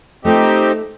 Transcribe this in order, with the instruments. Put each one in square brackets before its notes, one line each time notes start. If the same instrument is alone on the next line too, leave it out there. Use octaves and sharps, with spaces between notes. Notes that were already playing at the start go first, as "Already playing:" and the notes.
[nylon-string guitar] A3 F4 D#5 [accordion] C4 D#4 G4